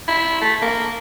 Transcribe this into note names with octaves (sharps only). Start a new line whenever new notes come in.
E4
A3
A#3